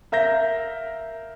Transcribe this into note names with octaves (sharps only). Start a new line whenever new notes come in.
A#4 E5 F5 G6 A#6